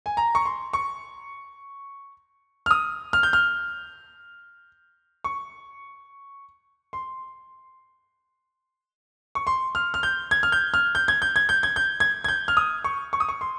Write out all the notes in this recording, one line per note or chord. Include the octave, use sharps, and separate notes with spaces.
G#5
A#5
C#6
C6
C#6
F6
D#6
F6
G6
F6
C#6
C6
C#6
C6
F6
F6
G6
G#6
F6
G6
F6
G6
G#6
G6
G#6
G6
G#6
G6
G#6
G#6
G6
F6
D#6
C#6
C#6
D#6
C#6
C6